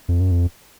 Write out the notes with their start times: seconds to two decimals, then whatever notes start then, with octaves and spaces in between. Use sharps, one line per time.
0.09 F2
0.20 F#2
0.31 F2